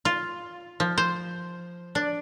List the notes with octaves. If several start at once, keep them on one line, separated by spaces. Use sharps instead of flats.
F4
F3
C5
D4